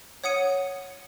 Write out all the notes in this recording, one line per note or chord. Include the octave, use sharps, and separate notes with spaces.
C#5 F#5 D#6 C#7 D#7